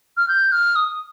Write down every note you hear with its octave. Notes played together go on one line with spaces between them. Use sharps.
F6
G6
F6
D#6